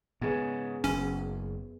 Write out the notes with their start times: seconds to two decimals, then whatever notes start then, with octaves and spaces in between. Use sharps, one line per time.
0.21 G#2 C#3 B3 G#4 B4
0.84 F#1 C#4